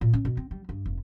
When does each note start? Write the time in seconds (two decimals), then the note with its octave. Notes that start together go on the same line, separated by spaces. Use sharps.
0.01 A#2
0.13 C#4
0.25 B2
0.37 C4
0.51 G3
0.69 G2
0.86 F1